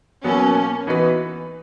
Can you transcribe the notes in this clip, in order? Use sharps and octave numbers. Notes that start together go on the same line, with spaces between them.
B2 F#3 A#3 B3 C#4
E3 B3 D#4 F#4 B4